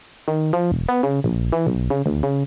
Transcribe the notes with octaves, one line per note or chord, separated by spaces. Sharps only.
D#3
F3
E1
B3
C#3
A#1
E3
B1
C#3
D2
C#3